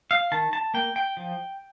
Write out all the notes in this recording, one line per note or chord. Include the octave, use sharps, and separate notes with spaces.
F5
D#3 A5
A5
A#3 G5
G5
F3